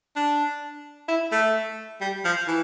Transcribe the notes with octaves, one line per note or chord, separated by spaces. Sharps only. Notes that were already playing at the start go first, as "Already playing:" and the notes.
D4
E4
A3
G3
F3
E3